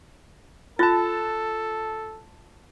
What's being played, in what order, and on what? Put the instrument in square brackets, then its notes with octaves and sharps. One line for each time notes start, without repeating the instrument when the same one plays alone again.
[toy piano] F4 [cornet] A4 [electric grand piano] A5 F#6 A6